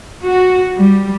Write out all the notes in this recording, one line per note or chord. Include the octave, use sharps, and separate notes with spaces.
F#4
G3